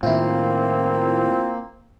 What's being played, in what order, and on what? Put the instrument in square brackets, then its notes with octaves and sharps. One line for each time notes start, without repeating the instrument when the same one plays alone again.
[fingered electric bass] A2 D#3 [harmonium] A#3 [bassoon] C4 [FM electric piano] E4 F4